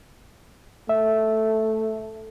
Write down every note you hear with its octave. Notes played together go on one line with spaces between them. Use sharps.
A3 E5